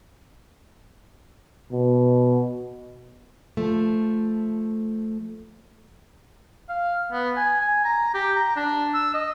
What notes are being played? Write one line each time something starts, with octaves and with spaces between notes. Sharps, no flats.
B2
F3 A3
F5
B3
G#5
G#5
A#5
G4
A#5
D4
E6
D#5